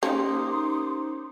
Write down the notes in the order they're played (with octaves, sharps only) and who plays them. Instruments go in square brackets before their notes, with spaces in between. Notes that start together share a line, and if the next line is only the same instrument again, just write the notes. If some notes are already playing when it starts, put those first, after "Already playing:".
[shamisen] A#3 [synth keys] C#4 G4 C5 [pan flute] D#4 [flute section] C6 D6 D#6